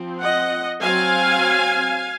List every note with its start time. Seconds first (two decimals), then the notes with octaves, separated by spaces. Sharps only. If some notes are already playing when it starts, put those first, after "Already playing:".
Already playing: F3 C4
0.21 D#5 F#5
0.82 F#3 C4 F5 G#5